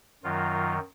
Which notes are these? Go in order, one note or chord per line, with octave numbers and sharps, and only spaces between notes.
F#2 D#3 F#3 F4